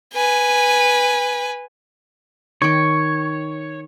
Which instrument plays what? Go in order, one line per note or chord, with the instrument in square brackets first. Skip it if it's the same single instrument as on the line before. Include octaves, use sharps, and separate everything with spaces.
[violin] B4 G#5
[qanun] D#3 G5 [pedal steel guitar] C#5